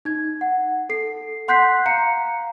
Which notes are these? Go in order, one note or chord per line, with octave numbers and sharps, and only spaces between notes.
D#4 G#6
F#5
A4 C7
F#5 C6 F#6 G6 B6 C7
F5 A#5 C#7